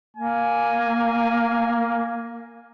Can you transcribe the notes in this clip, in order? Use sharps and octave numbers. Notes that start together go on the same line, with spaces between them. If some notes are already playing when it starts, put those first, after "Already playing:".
A#3 G#5